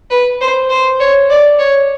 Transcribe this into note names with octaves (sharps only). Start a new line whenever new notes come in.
B4
C5
C5
C#5
D5
C#5